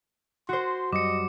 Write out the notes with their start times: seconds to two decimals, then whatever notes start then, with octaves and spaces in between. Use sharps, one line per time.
0.49 F#4 C5 C6
0.93 F#2 G3 D#5 D6 C#7